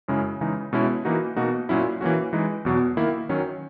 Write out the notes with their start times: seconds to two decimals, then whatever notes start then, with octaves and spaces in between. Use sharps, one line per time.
0.08 F#2 C#3 G#3 C#4 E4
0.41 C#3 E3 G#3 D#4
0.73 B2 G#3 C#4 E4
1.05 E3 A#3 D#4 F#4
1.37 B2 A#3 D#4 F#4
1.69 A#2 F#3 C#4 E4
2.01 E3 A#3 C#4 F#4
2.33 E3 G#3 D#4
2.65 E2 B2 F#3
2.97 D#3 A#3 E4
3.29 D#3 F#3 C#4